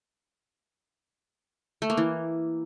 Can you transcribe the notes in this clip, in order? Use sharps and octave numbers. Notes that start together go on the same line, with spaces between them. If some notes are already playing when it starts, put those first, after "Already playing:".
A3
A#3
E3